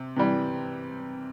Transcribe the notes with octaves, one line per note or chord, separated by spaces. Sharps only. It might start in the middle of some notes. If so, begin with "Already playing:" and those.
Already playing: C3
C3 E3 G3